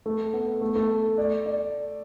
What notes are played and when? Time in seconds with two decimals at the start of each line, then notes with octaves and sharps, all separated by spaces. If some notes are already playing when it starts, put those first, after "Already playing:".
0.06 A3
0.33 B3
0.61 A3
0.75 A3
1.18 D5
1.46 D5